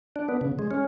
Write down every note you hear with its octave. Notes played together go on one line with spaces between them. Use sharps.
D4
B3
C#3
G#3
C#4